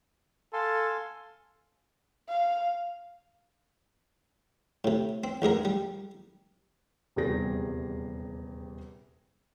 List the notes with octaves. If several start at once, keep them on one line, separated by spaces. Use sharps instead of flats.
A4 F5 G#5 C6
F5
A2 C3
C4
A1 G#2 G#4 A#4
G3
D#1 E2 C3 G3 G#4 A#6